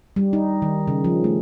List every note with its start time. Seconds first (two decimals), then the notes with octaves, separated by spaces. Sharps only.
0.16 G3
0.33 D#4
0.62 D#3
0.87 C#3
1.04 F3
1.24 A3